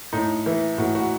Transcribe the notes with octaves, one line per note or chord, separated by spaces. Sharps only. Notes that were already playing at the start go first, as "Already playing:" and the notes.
A2 D#4
E3 E4
A2 F#4
F#4